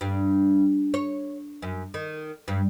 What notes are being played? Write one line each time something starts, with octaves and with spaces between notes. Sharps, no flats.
G2
C#5
F#2
D#3
G2